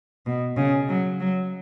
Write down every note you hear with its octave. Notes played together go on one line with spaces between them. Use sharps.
B2
C#3
F#3
F#3